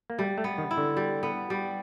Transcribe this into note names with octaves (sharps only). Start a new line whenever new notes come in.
A#3
G3 A3
A3
B3
D#3
E4
D3
G3
B3
G3